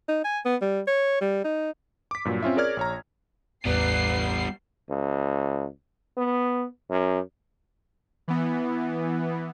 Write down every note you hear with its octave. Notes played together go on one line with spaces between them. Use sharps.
D#4
G#5
B3
G3
C#5
G3
D#4
D6 B6
G2 A#2 F#3
C4 C#4 F4 E5
G#4 A#4 C#5 D5 F6 G#6
A#1 C#5 A#5
A1 E2 G3 B3 B4 C7
C#2
B3
F#2
E3 B3